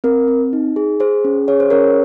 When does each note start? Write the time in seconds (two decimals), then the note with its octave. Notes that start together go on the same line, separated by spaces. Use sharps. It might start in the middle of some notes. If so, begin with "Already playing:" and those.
0.04 C4 A#4
0.28 C4
0.53 D#4
0.76 G#4
1.00 G#4 C5
1.25 C#4
1.48 G#4 C#5
1.60 C5
1.70 C#4 A#4 C#5